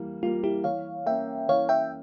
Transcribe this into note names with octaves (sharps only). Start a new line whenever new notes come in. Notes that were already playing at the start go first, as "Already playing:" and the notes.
Already playing: E3 G3 A#3
G3 A#3 F4
E4 G4
E3 C#5 F5
A#3 C#4 E5 G5
E3 C#5 F5
E5 G5